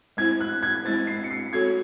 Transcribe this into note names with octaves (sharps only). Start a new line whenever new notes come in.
G#3 C4 E4 C5 G#6
F#6
G#6
G#3 C4 E4 C5 A6
C7
C#7
C7
C4 F#4 A4 C#5 G#6